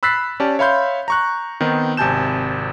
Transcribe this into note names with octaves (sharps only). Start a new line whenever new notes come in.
B5 E6 F#6 A6 B6 C7
C#4 G4 D5 A5
C#5 E5 F5 B5 C6 G6
A#5 C#6 F#6
D#3 B3 C4 D#4
G#1 C3 G#5 A5 G6 E7